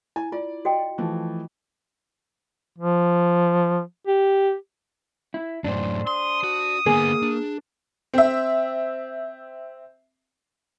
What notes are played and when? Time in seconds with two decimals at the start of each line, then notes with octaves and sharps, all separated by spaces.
0.16 E4 G#5
0.32 F4 D5
0.65 F#4 D#5 G5
0.98 E3 F3 A3
2.78 F3
4.07 G4
5.34 E4
5.64 F#2 A2 D4 C5
6.07 C6 D#6
6.44 F#4
6.86 D3 A#3 B3 G#4
7.23 D4
8.14 C4 E5